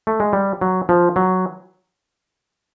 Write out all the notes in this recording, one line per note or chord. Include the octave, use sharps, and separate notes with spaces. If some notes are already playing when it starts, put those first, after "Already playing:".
A3
G#3
G3
F#3
F3
F#3